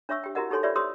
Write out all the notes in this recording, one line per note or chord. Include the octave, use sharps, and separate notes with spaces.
D4 C#5 E5 C#6 E6
G4 G5
E4 F#4 G4 A#4 D#5 F#5
D#4 G4 A4 C#5 G#5 C6
F4 G4 B4 C#5 D5 E5
G4 C5 C#5 C6 D#6 E6